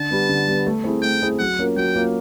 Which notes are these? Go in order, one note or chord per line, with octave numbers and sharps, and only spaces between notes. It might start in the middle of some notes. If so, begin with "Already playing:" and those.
Already playing: D3 A5
G3 B3
D3
G3 B3
A3
C4 E4 G#4
A3 G5
C4 E4 G#4
F#3 F#5
A#3 C#4 F4 A#4
F#3 G5
A#3 C#4 F4 A#4